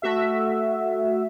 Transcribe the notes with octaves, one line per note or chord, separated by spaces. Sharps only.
A3 F#4 E5